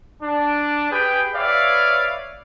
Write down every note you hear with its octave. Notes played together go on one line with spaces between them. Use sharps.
D4
G4 G#4 B4 G5
B4 C#5 D5 E5 F5